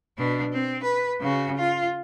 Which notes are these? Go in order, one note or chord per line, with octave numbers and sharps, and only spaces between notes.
B2 D4
C4
B4
C#3 F#4
F4